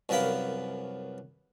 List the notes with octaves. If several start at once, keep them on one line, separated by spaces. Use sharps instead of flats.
C2 F#2 B3 A#4 F5 B5